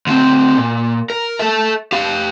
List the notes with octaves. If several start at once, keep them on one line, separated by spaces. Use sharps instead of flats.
D2 C4
A#2
A#4
A4 E5
G4 F5